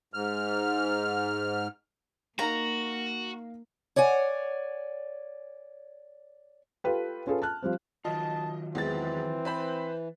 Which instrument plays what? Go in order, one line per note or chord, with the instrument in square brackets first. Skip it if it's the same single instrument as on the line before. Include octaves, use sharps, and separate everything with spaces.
[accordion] G#2 F6
[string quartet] A#3 [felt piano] D#4 A#4 F5 [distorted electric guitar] F#4 [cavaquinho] A#5
[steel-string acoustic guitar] C#5 D5 F#5 G#5
[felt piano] F4 G4 A4 B4 G5
C#4 F4 G#4 A4 B4
A5 F6 F#6
F3 G3 C4
[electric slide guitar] D#3 F#3 F4 [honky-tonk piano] D#5 [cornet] A5
[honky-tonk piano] E2 G#3 A6 [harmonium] E3 [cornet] C4
[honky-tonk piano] B4 C5 B5